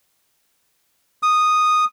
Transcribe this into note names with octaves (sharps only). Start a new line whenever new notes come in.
D#6